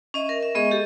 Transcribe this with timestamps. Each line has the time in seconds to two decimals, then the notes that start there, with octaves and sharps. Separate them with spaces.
0.14 C#4 D#5 E5
0.29 A#4
0.43 E5
0.55 G#3 B3 G#4 D#5 C#6
0.71 G4 A4